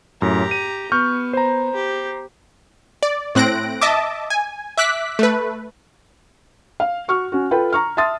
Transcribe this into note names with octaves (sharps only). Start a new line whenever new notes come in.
F#2 A2 G4 A#5
D#7
B3 C#6 F6 G6
C5 A#5
G4
D5
A2 C4 F#6 A#6 D7
D#5 E5 A5 D6
G#5
E5 D6 F#6 B6
A3 B4
F5
F#4 C#6 F6
C#4 F#4
F4 A4 B4 G5 B5
A#5 C#6 F6
E5 A5 C6 D#6 A6